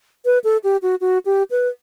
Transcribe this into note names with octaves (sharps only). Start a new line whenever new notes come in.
B4
A4
G4
F#4
F#4
G4
B4